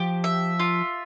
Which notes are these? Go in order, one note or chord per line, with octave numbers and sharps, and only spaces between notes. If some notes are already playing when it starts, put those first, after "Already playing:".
Already playing: F3 G4
E5
F4